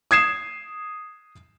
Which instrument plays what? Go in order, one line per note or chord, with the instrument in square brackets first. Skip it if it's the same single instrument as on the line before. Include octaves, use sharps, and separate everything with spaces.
[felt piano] D#6 G#6 C7 E7